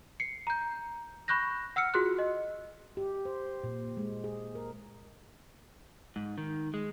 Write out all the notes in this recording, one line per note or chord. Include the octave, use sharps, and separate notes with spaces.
C7 C#7
A#5 G6
B5 C#6 F#6 G6 A#6
F#5 E6 F6 C#7
F4 F#4 G#4 C6 F#6
D#5
G4
C5
A#2
G#3
G#4
A#4
G#2
D#3
G#3